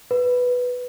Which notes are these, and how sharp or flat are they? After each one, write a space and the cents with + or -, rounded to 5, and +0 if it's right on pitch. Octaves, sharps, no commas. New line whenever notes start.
B4 +0